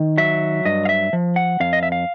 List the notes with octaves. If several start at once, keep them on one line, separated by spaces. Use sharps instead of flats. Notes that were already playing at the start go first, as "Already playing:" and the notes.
Already playing: D#3
F#3 E5
G2 D#5
F5
E5
F3
F#5
F2 F5
D#5
E5
F5